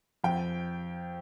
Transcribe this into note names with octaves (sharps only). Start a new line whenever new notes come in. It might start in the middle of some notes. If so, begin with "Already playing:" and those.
F2 G5